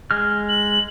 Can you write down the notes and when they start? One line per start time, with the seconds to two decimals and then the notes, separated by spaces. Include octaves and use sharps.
0.11 G#3 F6
0.49 F#7